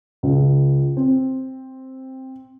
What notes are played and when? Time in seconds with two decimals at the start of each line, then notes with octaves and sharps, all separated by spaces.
0.23 C#2
0.97 C4